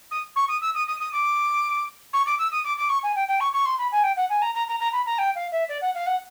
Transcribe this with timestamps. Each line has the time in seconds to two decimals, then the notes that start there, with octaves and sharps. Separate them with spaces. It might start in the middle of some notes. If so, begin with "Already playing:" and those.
0.11 D#6
0.36 C#6
0.48 D#6
0.61 E6
0.75 D#6
0.87 D#6
1.00 D#6
1.13 D6
2.13 C#6
2.26 D6
2.39 E6
2.52 D#6
2.65 D6
2.77 D6
2.89 C#6
3.03 G#5
3.16 G5
3.28 G5
3.40 C#6
3.53 C#6
3.65 C6
3.78 B5
3.92 G#5
4.04 G5
4.16 F#5
4.30 G#5
4.42 A#5
4.55 A#5
4.68 A#5
4.80 A#5
4.93 B5
5.06 A#5
5.18 G5
5.35 F5
5.52 E5
5.69 D5
5.82 F#5
5.95 F5
6.07 F#5